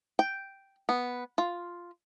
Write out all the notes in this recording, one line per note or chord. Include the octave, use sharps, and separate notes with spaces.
G5
B3
F4